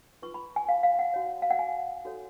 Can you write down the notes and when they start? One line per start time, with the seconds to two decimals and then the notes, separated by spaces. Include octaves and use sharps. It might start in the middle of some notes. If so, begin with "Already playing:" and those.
0.22 F4 B4 C#6
0.34 B5
0.56 G#5
0.69 F5
0.83 F5
0.99 F#5
1.14 F#4 C#5
1.42 F5
1.51 F#5
1.59 G#5
2.05 F#4 A4 C#5